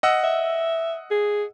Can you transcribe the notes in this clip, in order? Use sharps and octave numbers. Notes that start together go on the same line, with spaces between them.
D#5 F#5 E6
E5
G#4